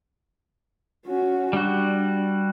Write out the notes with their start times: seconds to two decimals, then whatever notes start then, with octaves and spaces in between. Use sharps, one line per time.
1.06 C#4 F#4
1.53 G3 D4 F#4